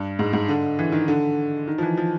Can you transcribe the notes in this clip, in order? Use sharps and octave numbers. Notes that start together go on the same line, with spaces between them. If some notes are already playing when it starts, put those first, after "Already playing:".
Already playing: G2
G#2
G#2
D3
E3
D#3
D3
D#3
F3
E3
F3